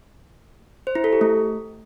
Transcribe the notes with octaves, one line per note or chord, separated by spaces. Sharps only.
C5
E4
A4
G4
A3